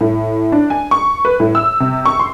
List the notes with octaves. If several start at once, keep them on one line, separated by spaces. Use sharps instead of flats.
A2
D4
G#5
C#6
B4
A2
E6
C3
C#6
C6